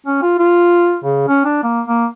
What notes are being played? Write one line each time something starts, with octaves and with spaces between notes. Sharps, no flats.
C#4
F4
F4
C#3
C#4
D4
A#3
A#3